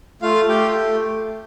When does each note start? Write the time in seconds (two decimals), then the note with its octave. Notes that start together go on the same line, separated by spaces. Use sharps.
0.22 A3 F4 F5
0.49 A3 G4 G5